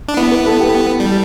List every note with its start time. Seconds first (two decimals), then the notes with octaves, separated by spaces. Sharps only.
0.08 D4
0.17 B3 E4
0.31 B4
0.46 A4
0.59 G4
1.00 G3